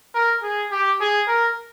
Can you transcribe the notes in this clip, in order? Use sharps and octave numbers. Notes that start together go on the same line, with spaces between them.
A#4
G#4
G4
G#4
A#4